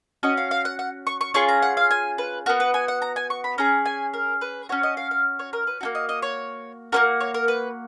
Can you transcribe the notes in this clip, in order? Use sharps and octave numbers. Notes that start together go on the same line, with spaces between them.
C#4 F#4 D#5
F5
F5
F#5
F#5
C#6
C#6
C#4 F4 G#4 C#6
A#5
F#5
F5
G#5
B4
B3 F#4 A#4
B4
G#5
F#5
A#5
G#5
C#6
B5
C#4 G#4 A#5
G#5
A#4
B4
C#4 F#4 C#5
D#5
F5
F5
C#5
A#4
B4
A#3 D#4 F#4
D#5
D#5
C#5
A#3 C#4 F#4 A#4
C#5
A#4
B4